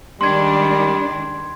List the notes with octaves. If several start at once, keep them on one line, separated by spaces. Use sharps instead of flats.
D#3 G3 G#3 D4 C6 G#6